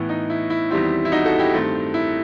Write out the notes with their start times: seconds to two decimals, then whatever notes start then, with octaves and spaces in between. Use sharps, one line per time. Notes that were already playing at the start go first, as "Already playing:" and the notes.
Already playing: A2 E3 B3
0.09 D#4
0.30 E4
0.50 E4
0.70 E2 D#3 G3 C4 E4
1.05 E4
1.12 D#4 F#4
1.25 F#4 A4
1.39 E4 G4
1.53 G2 D#3 A3 C4
1.94 E4